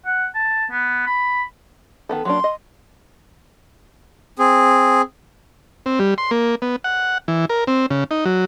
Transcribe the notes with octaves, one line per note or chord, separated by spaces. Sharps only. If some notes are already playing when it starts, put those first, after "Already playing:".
F#5
A5
B3
B5
D#3 B3 A4
F#3 A#3 D4 C6
D#5
C4 G#4
C4
G3
C6
A#3
B3
F#5
E3
A#4
C4
C#3
D#4
F#3